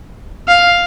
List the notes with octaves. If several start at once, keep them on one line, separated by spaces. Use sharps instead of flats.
F5